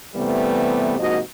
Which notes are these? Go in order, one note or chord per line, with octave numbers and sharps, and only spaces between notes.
C3 E3 G3 A3 B3
G#2 C3 F3 A#3 F#4 D#5